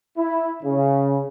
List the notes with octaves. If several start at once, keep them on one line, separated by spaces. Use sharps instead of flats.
E4
C#3